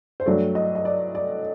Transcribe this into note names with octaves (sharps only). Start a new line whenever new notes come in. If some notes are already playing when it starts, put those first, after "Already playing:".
C5
G2 F#3 A3 D5
D#5
D#5
D5
D5